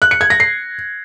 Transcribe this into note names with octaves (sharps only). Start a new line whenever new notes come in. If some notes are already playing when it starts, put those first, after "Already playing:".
F#6
C#7
G#6
A#6
C7